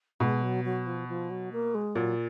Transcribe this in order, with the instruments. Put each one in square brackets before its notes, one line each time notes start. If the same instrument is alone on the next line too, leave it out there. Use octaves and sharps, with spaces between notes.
[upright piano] B2 [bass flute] G#3
[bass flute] F#3
F#3
F3
F3
F#3
A#3
G#3
[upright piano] A#2 [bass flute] F#3